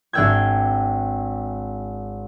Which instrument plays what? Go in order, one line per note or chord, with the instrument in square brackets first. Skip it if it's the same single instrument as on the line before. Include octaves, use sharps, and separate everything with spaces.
[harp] G#1 D4 E5 G5 E6 G#6